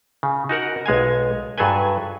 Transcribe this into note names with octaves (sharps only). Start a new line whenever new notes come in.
C#3
D#4 F#4 A#4 F#5
B1 G#3 F5 G#5
G2 F#3 G#4 A4 B4 G#5